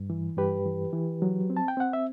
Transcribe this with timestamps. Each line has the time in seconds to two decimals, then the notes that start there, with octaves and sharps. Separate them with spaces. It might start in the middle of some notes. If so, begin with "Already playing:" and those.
Already playing: G2
0.10 E3
0.37 G2 G4 B4
0.66 E3
0.93 E3
1.22 F#3
1.50 C4
1.57 A5
1.68 G5
1.77 C4 F#5
1.93 E5